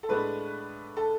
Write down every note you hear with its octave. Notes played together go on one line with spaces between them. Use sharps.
A4
A2 G#3 B3 D4 B4
A4